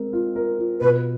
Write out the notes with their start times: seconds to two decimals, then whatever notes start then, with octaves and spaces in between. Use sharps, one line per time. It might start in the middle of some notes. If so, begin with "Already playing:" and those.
Already playing: G#3 C4 A#4
0.13 F4
0.36 A#4
0.58 F4
0.80 B2 B4